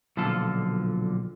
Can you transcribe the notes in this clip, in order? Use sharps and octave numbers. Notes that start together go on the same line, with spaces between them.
B1 A#2 D3 F3 F4 A4